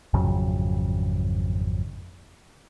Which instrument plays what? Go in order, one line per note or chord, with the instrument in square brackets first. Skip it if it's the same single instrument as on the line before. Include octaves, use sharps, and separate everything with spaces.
[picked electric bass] G#1 F2 C#3 F#3